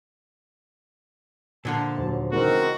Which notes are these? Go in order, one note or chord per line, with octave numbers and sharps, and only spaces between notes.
A#2 D3 F3 A5
D#1 F#3
C#3 E3 G#3 C4 D#4 F#4 A#4